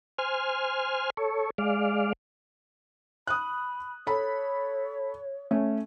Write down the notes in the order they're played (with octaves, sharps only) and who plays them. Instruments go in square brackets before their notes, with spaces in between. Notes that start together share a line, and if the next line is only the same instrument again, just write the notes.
[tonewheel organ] C5 G#5 F6
A4 C#5
G#3 D5 F5
[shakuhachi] B5 [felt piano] D#6 F#6
[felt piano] A4 B5 [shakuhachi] C#5
[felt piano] A3 C#4